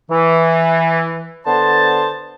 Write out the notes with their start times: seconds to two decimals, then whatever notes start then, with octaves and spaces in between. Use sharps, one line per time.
0.10 E3
1.47 D3 B3 C5 A5